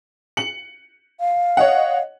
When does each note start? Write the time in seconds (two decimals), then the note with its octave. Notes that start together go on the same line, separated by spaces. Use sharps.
0.37 C#7 F#7
1.20 F5
1.57 C#5 D#5 F#5